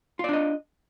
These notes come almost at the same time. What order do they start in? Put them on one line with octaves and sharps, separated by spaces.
F4 D5 D4 D#5